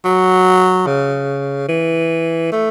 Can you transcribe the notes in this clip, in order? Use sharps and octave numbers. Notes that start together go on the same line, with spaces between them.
F#3
C#3
E3
A3